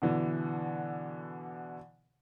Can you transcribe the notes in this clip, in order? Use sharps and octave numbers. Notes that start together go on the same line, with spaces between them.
B2 D3 E3